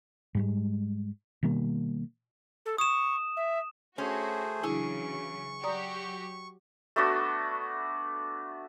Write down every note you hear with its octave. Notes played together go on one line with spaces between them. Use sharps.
G#2 G3 G#3
B2 D#3 G3 A#3
A4
C#6 D#6 E7
E5
A3 C#4 F#4 G#4 C5
C#3 E3 F#3 D4 E4 G#4 C#6
F#3 F#4 G4 D5 A#5 D#6
A3 B3 D4 F#4